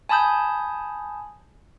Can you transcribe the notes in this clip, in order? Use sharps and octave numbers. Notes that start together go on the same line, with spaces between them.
G#5 A5 B5 D#6 G6